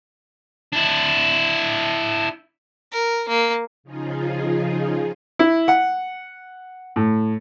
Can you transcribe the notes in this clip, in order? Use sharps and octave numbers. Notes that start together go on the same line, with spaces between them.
D4 E4
A#4
A#3
C#3 F3 D#4 F4 G#4
E4
F#5
A2